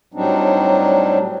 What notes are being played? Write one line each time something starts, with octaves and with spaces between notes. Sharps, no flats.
A2 F#3 G3 C4 D4 D#4